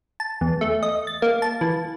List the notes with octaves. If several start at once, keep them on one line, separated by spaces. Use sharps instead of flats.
A5
E2
A3
D#5
A6
A#3
A5
E3